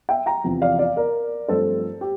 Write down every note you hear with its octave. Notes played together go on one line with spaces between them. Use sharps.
E5 G5
G5 A#5
E2 C3 F3 C4
D5 F5
D5 F5
A#4 D5
G2 F3 A3 C4 A4 C5
G4